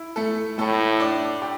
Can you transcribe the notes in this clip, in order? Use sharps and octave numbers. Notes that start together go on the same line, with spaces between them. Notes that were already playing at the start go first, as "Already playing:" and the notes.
Already playing: E4
A3 A4
A2 A3 A4
D4 D5
G4 G5